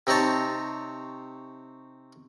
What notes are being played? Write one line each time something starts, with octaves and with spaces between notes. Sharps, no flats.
C3 C4 D#4 C#5 A5